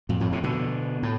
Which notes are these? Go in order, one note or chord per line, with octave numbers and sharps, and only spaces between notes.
F2 A2
F2 A2
A2 C3
B2 D3
A2